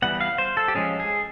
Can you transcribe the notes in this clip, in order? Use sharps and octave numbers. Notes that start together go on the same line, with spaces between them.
E3 G3 B3 F#5
F5
C5
A4
G4
F3 G#3 C#4 G#4
G#4